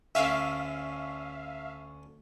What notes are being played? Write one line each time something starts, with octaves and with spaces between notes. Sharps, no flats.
D2 D3 C#4 E5 F5